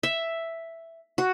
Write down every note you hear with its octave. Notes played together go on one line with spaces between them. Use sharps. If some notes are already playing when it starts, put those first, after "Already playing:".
E5
F#4